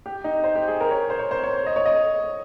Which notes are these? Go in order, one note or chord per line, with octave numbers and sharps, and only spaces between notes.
G4
D#4
C5
G4
G#4
A#4
C#5
C5
C#5
C5
C#5
C#5
D#5
C#5
D#5